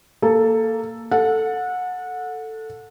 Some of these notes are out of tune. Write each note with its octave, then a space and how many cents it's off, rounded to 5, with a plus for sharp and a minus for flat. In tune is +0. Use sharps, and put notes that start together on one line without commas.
A#3 -15 A4 +0
A4 +5 F#5 -25